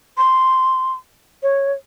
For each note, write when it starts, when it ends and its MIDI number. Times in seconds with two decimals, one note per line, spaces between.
0.17 0.93 84
1.43 1.72 73